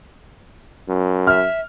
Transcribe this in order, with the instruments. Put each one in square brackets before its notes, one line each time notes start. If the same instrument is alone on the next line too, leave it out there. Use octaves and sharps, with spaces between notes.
[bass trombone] F#2
[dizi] E5 [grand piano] F6